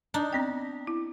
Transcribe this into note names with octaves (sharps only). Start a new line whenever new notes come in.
D4 D#4
B3 C4 G5
E4